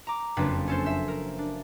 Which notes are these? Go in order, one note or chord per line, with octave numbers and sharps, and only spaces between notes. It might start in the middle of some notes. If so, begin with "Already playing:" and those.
A#5 D6
F#1 F2 C4 D4 B4
C#4 A4 C5
C5 E5
A#4
D4